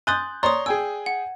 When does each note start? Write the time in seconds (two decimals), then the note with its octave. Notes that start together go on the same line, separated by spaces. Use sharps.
0.07 G#5 C6 D#6 F#6 G6 A6
0.43 C#5 D5 A#5 C6 D#6
0.66 G#4 G5 G#5 E6
1.06 F#5